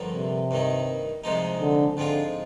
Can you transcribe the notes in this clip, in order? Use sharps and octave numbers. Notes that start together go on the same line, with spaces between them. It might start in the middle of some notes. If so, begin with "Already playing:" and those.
Already playing: G2 D3 F3 A#3
C3
G2 D#3 A#3
C2 C3 F3 G#3 D#4
D3
G#2 D3 F3 C4 F4